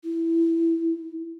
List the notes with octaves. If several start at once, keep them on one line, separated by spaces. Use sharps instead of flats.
E4